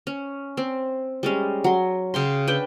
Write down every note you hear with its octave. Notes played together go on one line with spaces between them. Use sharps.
C#4
C4
G3 G#3 C#4
F#3 C6
C#3 G5 C6
D4 B4 G5